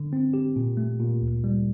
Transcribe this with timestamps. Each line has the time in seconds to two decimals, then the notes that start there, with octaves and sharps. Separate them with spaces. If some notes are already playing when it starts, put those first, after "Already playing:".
Already playing: D3
0.13 C4
0.34 G4
0.56 A#2
0.77 A3
1.00 A#2
1.22 D2
1.44 G3